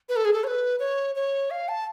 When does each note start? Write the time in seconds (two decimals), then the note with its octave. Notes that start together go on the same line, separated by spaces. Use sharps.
0.09 B4
0.16 A4
0.25 G#4
0.33 A4
0.44 C#5
0.47 B4
0.79 C#5
1.15 C#5
1.51 F5
1.69 A5